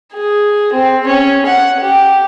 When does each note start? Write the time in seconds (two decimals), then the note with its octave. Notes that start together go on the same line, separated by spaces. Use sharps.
0.13 G#4
0.73 C4
1.07 C#4
1.45 F#5
1.81 G4